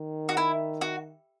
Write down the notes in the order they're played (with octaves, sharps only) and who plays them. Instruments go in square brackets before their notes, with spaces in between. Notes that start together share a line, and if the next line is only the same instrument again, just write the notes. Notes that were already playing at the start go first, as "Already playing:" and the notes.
Already playing: [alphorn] D#3
[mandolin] F#4
E4
F#4